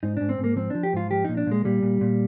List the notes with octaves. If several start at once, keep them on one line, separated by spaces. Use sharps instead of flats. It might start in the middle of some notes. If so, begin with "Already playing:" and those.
G#2 D#4
G#2 D4
C4
G#2
A#3
F3 C4
F3 D4
G4
G#2 F4
F3 G4
A#2 D#4
D4
A#2 G#3
A#2 G3
A#2
A#2